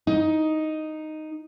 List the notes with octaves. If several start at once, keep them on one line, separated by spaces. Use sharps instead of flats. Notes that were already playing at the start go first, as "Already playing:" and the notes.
D#4